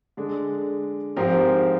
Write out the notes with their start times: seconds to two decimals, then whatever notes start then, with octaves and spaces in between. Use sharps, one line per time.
0.17 D3 G#3 D4
1.16 G#2 F3 C4 G4 A#4